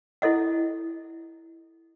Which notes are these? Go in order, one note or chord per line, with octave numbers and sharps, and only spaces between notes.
E4 A4 D#5 F#5